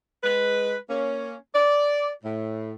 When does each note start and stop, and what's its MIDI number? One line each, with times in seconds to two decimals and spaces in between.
0.23 0.76 56
0.23 0.76 71
0.90 1.34 58
0.90 1.34 61
1.55 2.11 74
2.24 2.73 45